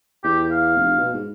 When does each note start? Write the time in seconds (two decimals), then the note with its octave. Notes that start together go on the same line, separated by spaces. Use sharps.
0.24 E2 G4
0.51 F5
0.77 F1
0.98 B2
1.14 G#2